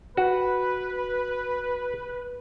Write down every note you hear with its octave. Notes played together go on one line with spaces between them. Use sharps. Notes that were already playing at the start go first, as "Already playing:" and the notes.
F#4 B4